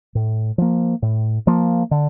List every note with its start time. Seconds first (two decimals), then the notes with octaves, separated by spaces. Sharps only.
0.15 A2
0.58 F3 A#3
1.02 A2
1.47 F3 A#3
1.91 D3